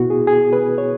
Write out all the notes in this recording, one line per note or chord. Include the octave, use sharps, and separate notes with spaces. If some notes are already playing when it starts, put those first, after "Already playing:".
Already playing: B2 B3 E4 F#4
G#4
G#4
B4
C#5